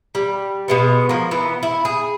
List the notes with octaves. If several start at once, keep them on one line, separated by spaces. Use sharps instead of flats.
G3
B2 G#3 B3
F3 A#3
E3 B3
E4
G#4